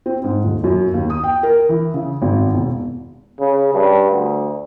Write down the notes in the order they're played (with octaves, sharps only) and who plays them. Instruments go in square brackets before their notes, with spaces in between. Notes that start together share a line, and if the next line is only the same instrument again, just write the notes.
[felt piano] C4
G#2
D#1
F#2
D#2
D#6
G5
A#4
E3
C#3
G#1
E1
[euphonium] C#3
G2
D2